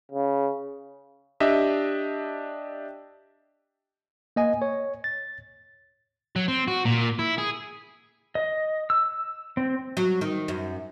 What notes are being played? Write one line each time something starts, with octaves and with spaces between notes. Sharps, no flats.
C#3
D4 G4 D#5 E5
A#3 D#5 G#5
C#5
A6
F#3
C4
F#4
A#2
E4
G#4
D#5
E6
C4
F#3
D#3
F#2